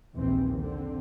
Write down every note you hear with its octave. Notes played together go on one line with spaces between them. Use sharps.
A#1 D#2 E3 C4
D3 C4